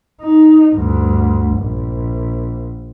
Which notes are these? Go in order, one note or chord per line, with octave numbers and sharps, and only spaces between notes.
D#4
D2 G2
A#1